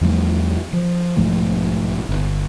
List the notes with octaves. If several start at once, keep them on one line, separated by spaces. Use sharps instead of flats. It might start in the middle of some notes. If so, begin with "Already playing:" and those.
E2 F3 G3 A3
F3
B1 G#2 F3 A3
G1